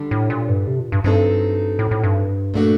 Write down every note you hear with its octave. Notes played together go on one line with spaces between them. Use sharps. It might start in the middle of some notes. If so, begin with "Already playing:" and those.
Already playing: D3 G3 D4
A2
A#2
G2
C3
A#2
G2
G2 F#3 C4 D#4 A4
A2
A2
G2
A#2 A3 D4 F#4